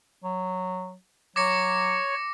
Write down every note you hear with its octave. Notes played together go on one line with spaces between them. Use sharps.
F#3
F#3 C#5 D6 A#6 C#7